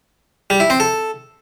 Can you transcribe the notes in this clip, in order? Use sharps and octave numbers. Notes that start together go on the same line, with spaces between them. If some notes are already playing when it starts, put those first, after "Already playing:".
G3
E4
C4
A4